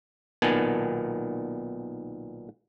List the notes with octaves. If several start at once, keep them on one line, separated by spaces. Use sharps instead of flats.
B1 A#2 D#3 B3 G#5 A5